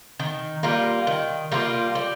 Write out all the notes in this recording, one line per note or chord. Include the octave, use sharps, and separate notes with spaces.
D#3
G3 A#3 F4
D#3
G3 A#3 F4
G3